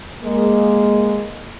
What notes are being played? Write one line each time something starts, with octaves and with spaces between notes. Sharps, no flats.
G#3 A#3